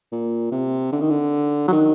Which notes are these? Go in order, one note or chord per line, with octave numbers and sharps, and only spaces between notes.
A#2
C3
D3
D#3
D3
F#3
D#3